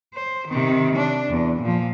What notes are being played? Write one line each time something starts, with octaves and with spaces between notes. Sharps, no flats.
C5
C3 D#3
D4
E2
A#2 F3